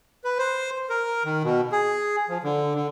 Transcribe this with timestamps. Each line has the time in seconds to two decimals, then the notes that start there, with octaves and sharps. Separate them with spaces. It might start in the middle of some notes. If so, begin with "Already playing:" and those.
0.24 B4
0.38 C5
0.90 A#4
1.25 D#3
1.44 B2
1.72 G#4
2.29 F3
2.44 D3
2.75 D3